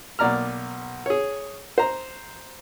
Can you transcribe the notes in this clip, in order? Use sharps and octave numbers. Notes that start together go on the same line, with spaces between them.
B1 A#3 D5 A#5 F6
G#4 C#5
C5 A#5